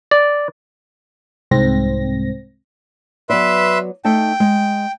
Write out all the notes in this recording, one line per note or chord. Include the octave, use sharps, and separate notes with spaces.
D5
C2 G#2 C4 A#6
F#3 B3 B4 D5 E5 C6
A3 D#4 G5 A5
G#3